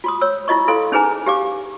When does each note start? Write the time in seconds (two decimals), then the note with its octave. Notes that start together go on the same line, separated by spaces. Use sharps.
0.04 F4 C6 D#6
0.21 C#5 E6
0.48 E4 F4 D#5 C#6
0.68 E4 A4 F5 C6
0.92 C#4 D#4 G#4 B4 G#5 A#5
1.26 G4 F5 D6